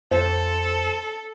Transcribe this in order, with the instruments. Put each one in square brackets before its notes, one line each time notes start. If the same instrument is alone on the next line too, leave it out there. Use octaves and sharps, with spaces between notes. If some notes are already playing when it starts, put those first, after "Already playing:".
[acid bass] F2 [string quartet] A4 [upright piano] C5